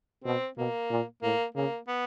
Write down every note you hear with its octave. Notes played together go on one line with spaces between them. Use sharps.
B2 C4
B2 A#3
A#2
A2 A#3
C#3 A#3
B3